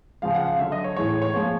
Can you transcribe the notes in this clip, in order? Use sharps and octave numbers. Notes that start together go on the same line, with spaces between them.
C#3 F3 G#3 F5
F#5
F5
D3 F#3 E5
D#5
C#5
A2 E3 G#3 C#5
C#5
C#5
A#2 F3 G#3 C#5